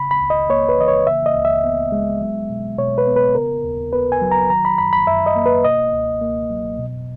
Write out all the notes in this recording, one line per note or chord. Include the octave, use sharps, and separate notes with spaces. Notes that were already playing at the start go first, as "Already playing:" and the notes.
Already playing: C#3 B5
B5
C#2
D#5
A#3 C#5
B4
E3 D#5
C#5
C#3 E5
D#5
C#2
E5
B3
G#3
F#3
B2
B2 C#5
B4
B3
B4
C#3 A#4
D#2
B3 B4
G#5
F#3
A#5
D#3 A#5
B5
F#2 B5
B5
F#2 E5
D#5
A#3
B4
B2 D#5
C#2
A#3
F#3
B2